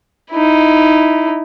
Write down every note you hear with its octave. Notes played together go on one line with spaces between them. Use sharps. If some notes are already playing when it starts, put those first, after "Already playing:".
D#4 E4